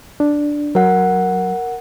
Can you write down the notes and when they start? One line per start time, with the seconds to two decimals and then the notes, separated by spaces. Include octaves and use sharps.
0.20 D4
0.75 F#3 A#4 F#5